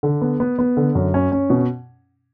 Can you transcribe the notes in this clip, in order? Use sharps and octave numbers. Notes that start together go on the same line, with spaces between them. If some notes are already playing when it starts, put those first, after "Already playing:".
D3
B3
B3
B3
D3
F#2
C#4
C#4
B2